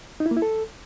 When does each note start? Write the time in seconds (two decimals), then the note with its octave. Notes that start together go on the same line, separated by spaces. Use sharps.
0.20 D#4
0.26 E4
0.31 A#3
0.37 E4
0.42 A4